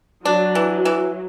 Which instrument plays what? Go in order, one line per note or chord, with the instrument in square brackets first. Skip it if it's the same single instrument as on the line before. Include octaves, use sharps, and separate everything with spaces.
[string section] F#3 [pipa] D4
[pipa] E3
E3